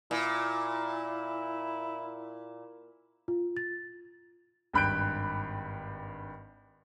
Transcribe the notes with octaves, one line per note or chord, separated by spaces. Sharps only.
A#2 E4
F4
A6
G#1 G2 B5 F#6 G6 D7